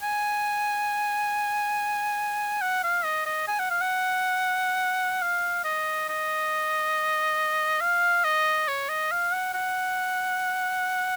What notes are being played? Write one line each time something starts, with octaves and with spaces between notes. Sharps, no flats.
G#5
F#5
F5
D#5
D#5
G#5
F#5
F5
F#5
F5
D#5
D#5
F5
D#5
C#5
D#5
F5
F#5
F#5